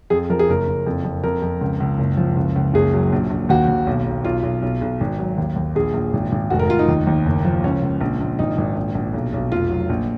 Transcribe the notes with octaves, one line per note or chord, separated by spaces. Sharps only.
F2 G#4
F3 A#4
G#4
F#1 A#4
F#1
F2
F2
F2 A#4
F2
C#2
C#2
F#1
F3
C#2
C#2
F#1 G#4
F#3
A#1
A#1
D#2 F#4
D#2
B1
B1
B1 F4
B1
B1
B1
G#1
F#3
D#2
D#2
A#1 G#4
A#1
G#1
G#1
F1 F#4
A#4
F1 F4
D#4
D#2
D#2
F#1
F3
C#2 C#4
C#2
A#1
A#1
G#1 D#4
G#1
A#1
A#1
B1
B1
F1 F4
F#3
A#1